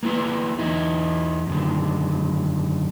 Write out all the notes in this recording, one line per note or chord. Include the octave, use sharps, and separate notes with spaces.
A#3 B3 E4 B4
E2 D#4 E4
F#2 D3 D#3